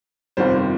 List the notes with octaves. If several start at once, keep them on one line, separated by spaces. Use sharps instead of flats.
G1 F2 C3 D#3 G3 C5